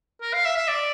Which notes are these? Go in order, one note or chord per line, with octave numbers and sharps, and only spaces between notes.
A#4
F5
E5
E5
D5